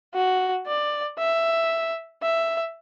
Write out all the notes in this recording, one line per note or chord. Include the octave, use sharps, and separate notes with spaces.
F#4
D5
E5
E5